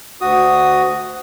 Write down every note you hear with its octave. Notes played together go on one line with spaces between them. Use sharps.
D2 F#4 D#6